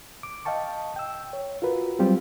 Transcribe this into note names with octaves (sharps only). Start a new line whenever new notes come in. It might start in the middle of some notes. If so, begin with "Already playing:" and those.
D6
D#5 F5 G5 A5 C#6
G5 E6
C#5
F4 F#4 A#4 B4
F#3 G3 C4 F4 G4